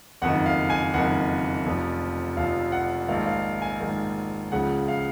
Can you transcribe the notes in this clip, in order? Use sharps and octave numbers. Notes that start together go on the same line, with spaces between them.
F#1 F2 D#3 F#5
F5
G#5
F#1 F2 D#3 F#5
F1 F2 F3
F1 F2 F3 F5
F#5
A#1 G#2 D#3 F5
F5
G#5
A#1 G#2 D#3
C#2 C#3 F3 F#5
F5